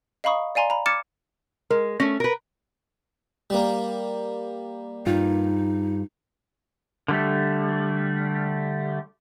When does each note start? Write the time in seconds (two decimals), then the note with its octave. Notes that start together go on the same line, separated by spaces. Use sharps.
0.24 D#5 F5 A#5 B5 C#6 D#6
0.55 D5 F5 G#5 A#5 C6
0.70 A#5 B5
0.86 D6 F6 G#6 A6 C#7 E7
1.71 G#3 A#4
2.00 A3 C#4 A#6
2.20 A#4 B4
3.50 G3 A#3
5.06 G2 D#4 F4
7.08 D3 G3 A3